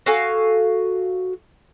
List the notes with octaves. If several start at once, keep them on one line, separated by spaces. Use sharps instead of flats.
F#4 A4 F5 G#5